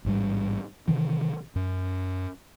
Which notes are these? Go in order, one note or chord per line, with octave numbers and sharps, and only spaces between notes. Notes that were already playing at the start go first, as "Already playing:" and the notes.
A1 G#2 G3
C3 D#3 E3
F#2